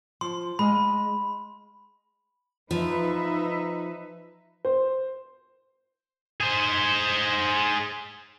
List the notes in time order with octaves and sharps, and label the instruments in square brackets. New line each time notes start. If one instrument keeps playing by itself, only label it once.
[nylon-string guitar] F3 [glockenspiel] C6
[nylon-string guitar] G#3 D#5 F5 [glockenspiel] B5
[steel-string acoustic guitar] F3 [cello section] D#4 B4 E5
[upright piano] C5
[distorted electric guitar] G#4 C5